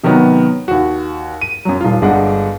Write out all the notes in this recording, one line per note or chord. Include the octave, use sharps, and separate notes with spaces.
C3 D#3 F#3 B3 F#4
D#2 F#4
D#7
F#2 F#3
D#1 F4
G1 G#3 D4 F#5